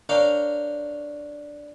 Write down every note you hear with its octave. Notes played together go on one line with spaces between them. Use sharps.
D4 A#4 C#5 F5 G5